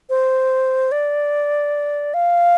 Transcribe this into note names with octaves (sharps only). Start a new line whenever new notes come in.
C5
D5
F5